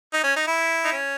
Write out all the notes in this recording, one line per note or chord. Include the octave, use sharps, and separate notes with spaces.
D#4
C#4
D#4
E4
D#4
C#4